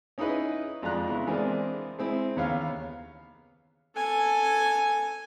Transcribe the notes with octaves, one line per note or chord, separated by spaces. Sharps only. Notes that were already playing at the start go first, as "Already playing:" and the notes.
C#4 D#4 E4 G#4 B4 D#5
F2 G#3 D4 F4 A#5 F#6
C#3 B3 E4
E3 G#3 B3 C4 D4 A#4
G#3 C4 E4
D#2 C#3 B3 C#5 F5
A4 G#5